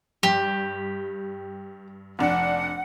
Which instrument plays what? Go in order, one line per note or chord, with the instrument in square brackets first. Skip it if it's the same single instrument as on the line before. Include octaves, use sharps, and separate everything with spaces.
[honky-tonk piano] G2 [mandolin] G4
[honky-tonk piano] F1 D4 [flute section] F#5